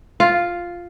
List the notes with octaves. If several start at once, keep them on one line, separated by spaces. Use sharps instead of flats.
F4